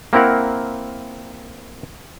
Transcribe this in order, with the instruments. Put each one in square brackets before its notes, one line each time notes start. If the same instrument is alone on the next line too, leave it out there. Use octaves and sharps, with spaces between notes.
[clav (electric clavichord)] A#3 C4 E4 A#4 F#5